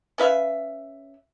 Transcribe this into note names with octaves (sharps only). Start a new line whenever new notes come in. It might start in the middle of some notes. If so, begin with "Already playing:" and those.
C#4 B4 E5 F5